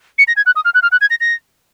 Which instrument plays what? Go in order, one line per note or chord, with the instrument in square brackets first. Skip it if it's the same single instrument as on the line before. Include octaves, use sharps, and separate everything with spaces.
[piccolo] C#7
A#6
G#6
F#6
D#6
F6
F#6
F6
F#6
G#6
A#6
A#6